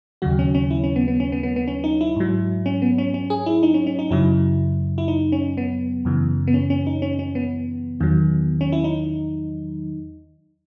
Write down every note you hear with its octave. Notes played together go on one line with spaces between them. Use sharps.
D#2 C#3 F#3 F#4
C#4
C#4
E4
C#4
B3
B3
C#4
B3
B3
B3
C#4
D#4
E4
G#2 F#3
C#4
B3
C#4
C#4
G#4
E4
D#4
C#4
C#4
D#4
F#2 C#3 F#3 E4
E4
D#4
C#4
B3
F#2 C#3 E3
B3
C#4
C#4
D#4
C#4
C#4
B3
E2 D#3 F#3
C#4
E4
D#4